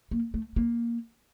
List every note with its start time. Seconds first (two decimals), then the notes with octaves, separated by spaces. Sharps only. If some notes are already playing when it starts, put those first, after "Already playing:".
0.11 A#3
0.34 A3
0.56 A#3